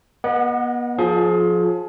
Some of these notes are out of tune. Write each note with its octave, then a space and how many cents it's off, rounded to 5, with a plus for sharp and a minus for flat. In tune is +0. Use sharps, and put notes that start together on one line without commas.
B3 -35 D#5 +0 F#5 +0
F3 +20 F4 +0 G#4 +30